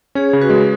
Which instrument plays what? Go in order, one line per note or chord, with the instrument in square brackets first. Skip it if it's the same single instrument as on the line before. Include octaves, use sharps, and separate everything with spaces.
[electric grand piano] C#4 [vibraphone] G#4 C#5
[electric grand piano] C#3
[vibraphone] F#4 B4
[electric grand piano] G#3